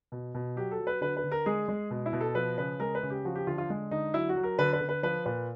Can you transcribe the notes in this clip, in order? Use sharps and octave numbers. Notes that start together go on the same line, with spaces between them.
B2
B2
F#3 G4
A4
F#3
B4
D3 B4
B4
D3
A#4
G#3 G#4
G#3
B2
E4
B2
A4
F3 B4
C#3 B4
G#3 A#4
B4
C#3
G4
F3 F#4
G4
D3 F4
F4
G#3
D3 D#4
F#3 E4
F#4
F#3
A#4
D3 B4
B4
D3
B4
F3 B4
A#2 B4